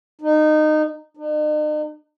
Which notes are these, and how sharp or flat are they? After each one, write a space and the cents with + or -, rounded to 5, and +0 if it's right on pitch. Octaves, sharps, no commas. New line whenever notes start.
D#4 -20
D#4 -45